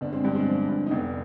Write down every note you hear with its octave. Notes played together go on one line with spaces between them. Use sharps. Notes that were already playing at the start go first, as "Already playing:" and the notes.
G1 B3 D4
G#3 C4
G2 G3 B3
G#3 C4
F3
G2
D#4
F1 B3 D4